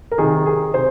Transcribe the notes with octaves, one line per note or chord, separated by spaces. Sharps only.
A#4
C3 D#3 G#4
G#4
C3 C5